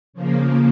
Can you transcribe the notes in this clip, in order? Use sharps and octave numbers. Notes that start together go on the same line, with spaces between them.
C#3 F3 A#3